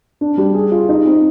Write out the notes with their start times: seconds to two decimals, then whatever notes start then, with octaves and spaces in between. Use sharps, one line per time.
0.21 D4
0.37 G3
0.54 G#4
0.72 F4
0.89 D#4
1.05 C4